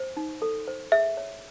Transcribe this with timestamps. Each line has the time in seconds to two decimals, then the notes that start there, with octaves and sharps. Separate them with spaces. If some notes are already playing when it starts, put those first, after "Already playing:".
Already playing: C5
0.17 D#4
0.42 A4
0.68 C5
0.92 G#4 E5
1.17 C#5